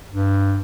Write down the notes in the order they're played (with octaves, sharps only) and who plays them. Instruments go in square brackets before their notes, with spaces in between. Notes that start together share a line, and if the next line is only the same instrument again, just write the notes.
[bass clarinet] G2